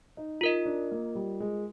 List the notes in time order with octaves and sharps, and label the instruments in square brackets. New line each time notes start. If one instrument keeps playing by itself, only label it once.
[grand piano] D#4
[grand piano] D#4 [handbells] F4 A#4 D#5
[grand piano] D4
A#3
G3
G#3